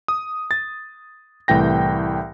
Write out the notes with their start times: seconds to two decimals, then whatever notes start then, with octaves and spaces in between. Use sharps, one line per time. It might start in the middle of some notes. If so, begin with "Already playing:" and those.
0.08 D#6
0.51 A6
1.48 C2 A2 E3 G5 A#6